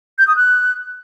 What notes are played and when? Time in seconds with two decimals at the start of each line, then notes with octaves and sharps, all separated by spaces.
0.19 G6
0.28 D#6
0.36 F#6